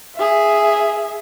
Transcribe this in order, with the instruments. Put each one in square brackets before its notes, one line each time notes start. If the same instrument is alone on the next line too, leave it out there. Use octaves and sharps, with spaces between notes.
[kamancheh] G#4 E5